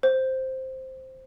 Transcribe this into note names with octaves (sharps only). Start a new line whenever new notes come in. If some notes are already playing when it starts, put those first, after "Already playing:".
C5